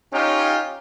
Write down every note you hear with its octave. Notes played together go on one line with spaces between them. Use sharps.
C#4 D#4 F4 G4